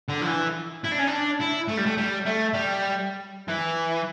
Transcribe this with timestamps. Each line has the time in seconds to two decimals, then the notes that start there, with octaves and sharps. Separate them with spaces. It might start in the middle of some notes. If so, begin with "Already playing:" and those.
0.08 D3
0.21 F3
0.27 E3
0.84 E4
0.92 D4
0.99 C#4
1.07 D4
1.41 E4
1.68 A3
1.78 G3
1.86 A3
1.97 G3
2.26 A3
2.54 G3
3.48 E3